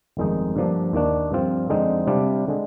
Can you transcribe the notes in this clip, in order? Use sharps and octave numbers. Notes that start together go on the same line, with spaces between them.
G1 F2 D#3 G#3 D#4
G2 D3 F3 A#3 D4
D#2 D#3 A#3 D4
G2 F3 C4 F4
F2 D3 G#3 C4 D#4
C3 G3 D4 F4
D3 G#3